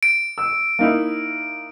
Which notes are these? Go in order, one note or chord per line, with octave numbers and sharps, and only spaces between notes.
D7
E6
A#3 D#4 E4